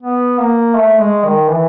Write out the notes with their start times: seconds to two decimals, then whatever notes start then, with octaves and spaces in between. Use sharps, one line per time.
0.02 B3
0.39 A#3
0.76 A3
1.00 G#3
1.25 D#3
1.49 E3